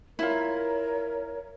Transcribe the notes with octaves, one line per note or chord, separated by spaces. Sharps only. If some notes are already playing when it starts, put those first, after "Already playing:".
E4 F4 A#4 C#5